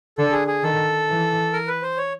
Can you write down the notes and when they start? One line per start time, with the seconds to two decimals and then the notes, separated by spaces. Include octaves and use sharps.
0.18 D3 A4
0.32 G#4
0.48 G#4
0.63 D#3 A4
1.08 E3
1.53 A#4
1.67 B4
1.82 C5
1.97 C#5